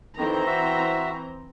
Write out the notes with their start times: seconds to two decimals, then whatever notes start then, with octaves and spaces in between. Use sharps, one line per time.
0.17 F2 D#3 E3 C4 A#5
0.46 F#4 E5